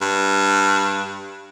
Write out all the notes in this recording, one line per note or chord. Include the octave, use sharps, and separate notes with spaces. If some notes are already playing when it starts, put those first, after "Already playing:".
G2